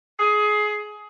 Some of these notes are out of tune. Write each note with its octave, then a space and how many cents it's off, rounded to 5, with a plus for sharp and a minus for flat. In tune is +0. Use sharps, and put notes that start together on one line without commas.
G#4 +20